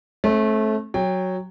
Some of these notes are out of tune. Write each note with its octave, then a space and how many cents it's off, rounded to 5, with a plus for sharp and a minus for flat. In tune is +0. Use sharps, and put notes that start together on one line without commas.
A3 -20 C4 +45
F#3 +0 G5 +20